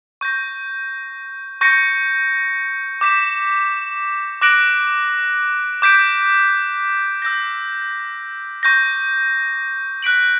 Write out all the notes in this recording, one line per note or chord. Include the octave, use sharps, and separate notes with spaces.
C#6 G6 A#6
C#6 G6 A#6 C#7
D6 G6 B6 E7
D6 F#6 A#6 D7 F#7
D6 G6 B6 D7
E6 G6 A#6
C#6 G6 A#6
F#6 B6 D7 F#7